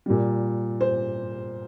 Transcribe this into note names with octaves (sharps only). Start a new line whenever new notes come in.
A#2 G3
C5